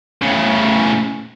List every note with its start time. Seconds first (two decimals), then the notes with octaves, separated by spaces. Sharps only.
0.22 A2 C#3